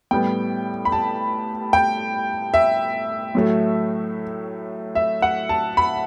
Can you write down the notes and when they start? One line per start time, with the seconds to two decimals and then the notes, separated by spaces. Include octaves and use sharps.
0.11 A2 G3 B3 G5
0.85 B5
0.92 A5
1.73 G5
2.54 E5
3.35 A2 F#3 A3
4.95 E5
5.22 F#5
5.49 A5
5.77 B5